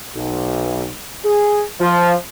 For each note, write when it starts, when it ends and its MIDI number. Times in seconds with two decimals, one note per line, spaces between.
0.15 0.88 35
1.24 1.62 68
1.80 2.12 53